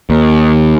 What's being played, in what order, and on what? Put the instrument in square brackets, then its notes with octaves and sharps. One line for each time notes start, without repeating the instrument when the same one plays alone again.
[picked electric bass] D#2